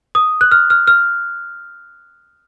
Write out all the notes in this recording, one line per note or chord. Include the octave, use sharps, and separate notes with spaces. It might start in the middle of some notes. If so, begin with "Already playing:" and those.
D#6
F#6
F6
F6
F6